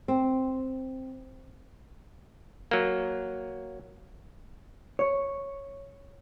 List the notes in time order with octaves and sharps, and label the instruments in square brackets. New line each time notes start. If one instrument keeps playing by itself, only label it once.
[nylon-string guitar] C4
[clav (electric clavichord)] F#3 A#3
[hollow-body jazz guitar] C#5